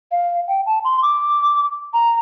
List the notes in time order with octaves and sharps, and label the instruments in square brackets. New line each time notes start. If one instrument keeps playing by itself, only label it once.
[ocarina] F5
G5
A5
C6
D6
A#5